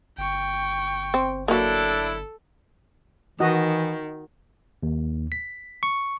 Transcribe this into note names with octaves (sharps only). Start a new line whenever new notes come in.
G1 G5 C#6
C4
F#3 A#3 D4 E4 A4
D#3 E3 F#4 D#5
D#2
B6
C#6